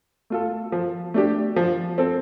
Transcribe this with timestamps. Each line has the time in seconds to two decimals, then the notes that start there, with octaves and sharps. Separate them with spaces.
0.30 A3 F4 A4
0.72 F3
1.14 A3 D4 G4
1.56 F3
1.98 C4 A4